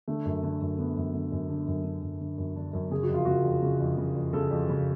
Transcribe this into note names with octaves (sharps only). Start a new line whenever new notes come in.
D3 A3
F#2
D3
F#2
D3 B3
F#2
D3
F#2
D3
F#2
D3
F#2
D3
F#2
D3 D4
F#2
C#3 G#4
F#4
F2
F4
C#3 F#4
F2
C#3
F2
C#3
F2
C#3 A4
F2
C#3